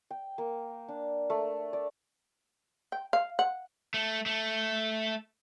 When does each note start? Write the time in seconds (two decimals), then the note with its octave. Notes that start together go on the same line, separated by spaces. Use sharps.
0.11 G5
0.38 A#3
0.88 D4
1.30 A3
1.73 D5
2.92 G5
3.13 F5
3.39 F#5
3.94 A3
4.26 A3